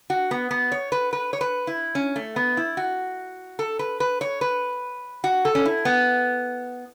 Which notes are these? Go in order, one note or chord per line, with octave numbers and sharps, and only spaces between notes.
F#4
B3
B3
C#5
B4
B4
C#5
B4
E4
C#4
A3
B3
E4
F#4
A4
B4
B4
C#5
B4
F#4
A4
C#4
E4
B3